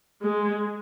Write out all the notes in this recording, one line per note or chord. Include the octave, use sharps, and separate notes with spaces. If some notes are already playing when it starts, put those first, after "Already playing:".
G#3